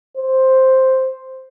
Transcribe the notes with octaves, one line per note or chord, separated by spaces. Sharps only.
C5